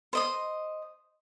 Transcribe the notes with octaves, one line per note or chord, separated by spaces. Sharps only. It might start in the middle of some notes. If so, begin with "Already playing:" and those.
C5 D#5 D#6